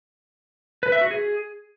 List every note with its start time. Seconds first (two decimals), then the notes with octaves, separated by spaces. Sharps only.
0.83 B4
0.92 E5
1.01 F#4
1.11 G#4